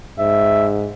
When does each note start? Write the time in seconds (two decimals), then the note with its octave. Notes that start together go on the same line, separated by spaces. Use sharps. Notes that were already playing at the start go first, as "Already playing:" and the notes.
0.19 G#2 E5